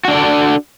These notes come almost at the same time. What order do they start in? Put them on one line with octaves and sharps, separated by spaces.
F#4 D4 D5 A4